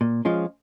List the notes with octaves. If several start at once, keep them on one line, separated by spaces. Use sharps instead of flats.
A#2
F3 G#3 C#4 F4